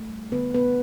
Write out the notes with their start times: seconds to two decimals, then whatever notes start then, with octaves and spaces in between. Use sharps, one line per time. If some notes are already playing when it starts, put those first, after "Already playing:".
Already playing: A3
0.09 G3
0.32 D3 B3 B4
0.54 B3 B4